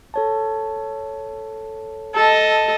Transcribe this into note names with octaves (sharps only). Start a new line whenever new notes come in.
A4 C#5 A5
A4 D#5 A5